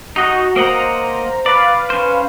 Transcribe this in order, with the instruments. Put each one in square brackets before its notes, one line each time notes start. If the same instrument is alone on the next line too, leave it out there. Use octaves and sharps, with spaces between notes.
[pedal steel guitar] D#4 D#5 [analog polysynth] F#4
[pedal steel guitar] A#3 D#5 F#5 [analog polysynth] C5 A#5
[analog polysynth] B4 F5 [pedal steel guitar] D5
[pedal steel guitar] C#4 C5